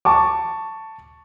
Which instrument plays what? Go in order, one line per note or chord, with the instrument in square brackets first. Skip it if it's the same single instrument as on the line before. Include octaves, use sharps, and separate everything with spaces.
[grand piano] A5 C#6 D6